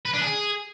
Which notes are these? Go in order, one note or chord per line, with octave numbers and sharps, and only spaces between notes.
B4
D4
G#4